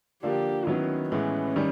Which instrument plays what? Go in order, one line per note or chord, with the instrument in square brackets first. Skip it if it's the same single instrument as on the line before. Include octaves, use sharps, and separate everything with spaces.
[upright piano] D3 F3 A#3 D4 [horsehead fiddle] G4
[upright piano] D#3 F#3 B3 E4 [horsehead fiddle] C#4
[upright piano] A2 E3 G#3 B3 [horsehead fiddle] C#4
[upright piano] D#3 G3